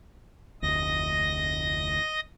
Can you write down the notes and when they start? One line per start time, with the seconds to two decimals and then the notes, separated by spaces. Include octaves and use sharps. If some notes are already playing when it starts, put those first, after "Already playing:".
0.62 F1 D2 D#5 A#6